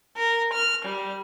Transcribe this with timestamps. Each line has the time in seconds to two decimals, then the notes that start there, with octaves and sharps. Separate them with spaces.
0.15 A#4
0.52 F6
0.85 G3